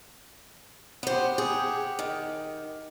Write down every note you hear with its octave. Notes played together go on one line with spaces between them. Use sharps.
B3 G4 C5 F#5
G#4
D#3